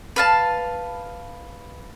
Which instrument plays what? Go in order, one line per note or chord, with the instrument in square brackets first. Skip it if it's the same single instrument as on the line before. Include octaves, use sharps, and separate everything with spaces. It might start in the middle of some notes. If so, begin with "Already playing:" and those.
[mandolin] B4 F5 A5